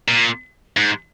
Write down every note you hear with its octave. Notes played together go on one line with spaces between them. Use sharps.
A#2
G#2